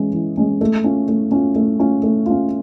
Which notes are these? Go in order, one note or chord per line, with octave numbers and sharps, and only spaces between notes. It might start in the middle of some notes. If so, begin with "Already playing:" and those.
Already playing: E3 G#3 C#4
E3
G#3 C#4
A3
C#4 F4
A3
C#4 F4
A3
C#4 F4
A3
C#4 F4